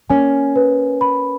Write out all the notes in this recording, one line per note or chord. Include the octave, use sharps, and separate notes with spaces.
A#3 C#4 G#5
B4
B5